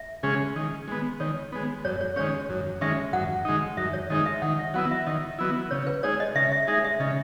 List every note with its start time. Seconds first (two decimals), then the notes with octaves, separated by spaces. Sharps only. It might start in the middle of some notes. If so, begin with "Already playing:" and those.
Already playing: E5
0.23 C#3 G#3 C#4 G#4
0.56 D#3
0.88 G#3 B3
1.20 D#3 C#5
1.52 G#3 B3
1.85 F#2 C#5
2.01 C#5
2.16 D#3 G#3 C#4 C#5
2.49 F#2
2.81 D#3 G#3 C#4 E5
3.13 F#2 F#5
3.45 D#3 G#3 D#4
3.77 F#2 E5
3.93 C#5
4.10 D#3 G#3 D#4 D#5
4.26 E5
4.42 D#3 F#5
4.59 E5
4.74 F#3 B3 E4 F#5
4.91 E5
5.06 D#3 D#5
5.39 F#3 B3 E4
5.71 C#3 C#5
5.87 B4
6.03 G#3 D#4 G#4 C#5
6.20 D#5
6.35 C#3 E5
6.52 E5
6.67 G#3 D#4 G#4 E5
6.84 E5
7.00 C#3 D#5